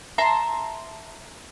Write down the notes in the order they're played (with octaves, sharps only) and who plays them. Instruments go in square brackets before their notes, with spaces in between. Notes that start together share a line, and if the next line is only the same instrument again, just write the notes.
[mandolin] E5 A5 A#5 C6